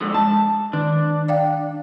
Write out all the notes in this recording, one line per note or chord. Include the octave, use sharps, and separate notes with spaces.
G#2 D3 F3
G#3 A5
D#3 D4
D5 F5 G5